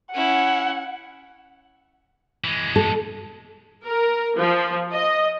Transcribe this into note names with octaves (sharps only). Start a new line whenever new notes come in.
C#4 E4 F#5
E3 G#3
A4
A#4
F3
D#5